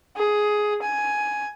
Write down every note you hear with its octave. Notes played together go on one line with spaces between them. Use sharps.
G#4
G#5